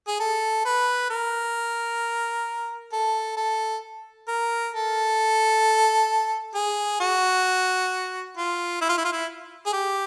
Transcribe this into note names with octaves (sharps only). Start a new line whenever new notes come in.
G#4
A4
B4
A#4
A4
A4
A#4
A4
G#4
F#4
F4
E4
F4
E4
F4
E4
G#4
G4